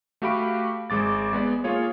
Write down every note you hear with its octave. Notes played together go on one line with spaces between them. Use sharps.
A3 F#4 G4 F5 B5 D7
G#1 G#3 D6 A6
G#3 B3 D5
A#3 F4 G#4 C#5